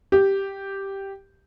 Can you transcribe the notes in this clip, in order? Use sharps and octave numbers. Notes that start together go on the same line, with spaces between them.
G4